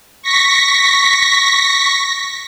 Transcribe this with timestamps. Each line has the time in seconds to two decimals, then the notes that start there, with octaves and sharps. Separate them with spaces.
0.22 C#6 A#6 B6